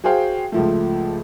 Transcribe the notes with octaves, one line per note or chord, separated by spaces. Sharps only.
F#4 G#4 C5 F5 G5
C#2 F3 A3